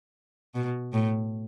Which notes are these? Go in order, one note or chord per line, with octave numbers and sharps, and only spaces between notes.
B2
A2